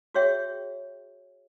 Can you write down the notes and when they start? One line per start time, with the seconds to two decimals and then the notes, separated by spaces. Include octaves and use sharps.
0.15 F#4 G#4 C#5 E5 G5